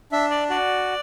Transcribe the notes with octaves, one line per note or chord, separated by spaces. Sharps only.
D4 E5
D5
F#4 D5